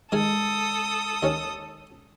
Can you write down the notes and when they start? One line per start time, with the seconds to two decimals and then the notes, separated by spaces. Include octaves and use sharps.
0.12 D#3 G#3 G#4 A4 G#5 D#6
1.23 D#2 D#3 C#4